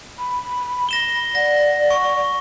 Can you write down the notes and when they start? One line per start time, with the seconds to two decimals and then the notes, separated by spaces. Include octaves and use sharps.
0.18 B5
0.89 A#6 E7 G7
1.35 D5 F#5 A#6
1.90 C#6